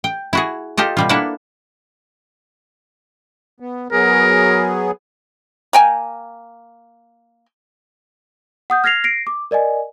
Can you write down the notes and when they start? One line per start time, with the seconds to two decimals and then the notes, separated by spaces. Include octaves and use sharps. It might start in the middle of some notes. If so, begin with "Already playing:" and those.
0.04 G5
0.33 E4 F#4 G#4
0.77 F4 G4 A4 D#5
0.97 B2 G3 F4
1.09 A#3 D4 E4 A4 B4 F#5
3.60 B3
3.92 F#3 B3 G#4 A#4
5.73 A#3 G5 G#5
8.70 F#5 D#6 G6
8.84 F6 G#6 A#6 C7 F7
9.04 A#6 C7 D7
9.27 D6
9.51 A#4 D5 D#5 G#5